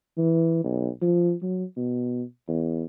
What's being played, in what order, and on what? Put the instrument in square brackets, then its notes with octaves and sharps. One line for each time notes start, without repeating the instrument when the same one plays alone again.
[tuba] E3
B1
F3
F#3
B2
E2